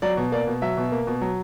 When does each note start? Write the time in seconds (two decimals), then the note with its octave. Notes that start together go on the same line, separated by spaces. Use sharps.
0.02 F#3 D5
0.17 B2
0.32 A#3 D5
0.47 B2
0.62 F#3 E5
0.77 B2
0.92 A#3
1.07 B2
1.22 F#3